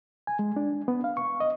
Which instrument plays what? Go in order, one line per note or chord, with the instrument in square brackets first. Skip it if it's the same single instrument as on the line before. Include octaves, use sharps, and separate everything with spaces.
[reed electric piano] G#5
G#3
D4
B3
F5
C#6
D#5